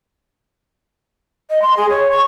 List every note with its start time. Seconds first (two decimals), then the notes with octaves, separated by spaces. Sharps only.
1.50 D#5
1.62 C6
1.77 G#4
1.90 C#5
2.12 C#6